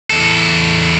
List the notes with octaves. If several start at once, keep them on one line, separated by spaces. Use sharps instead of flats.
E2 A4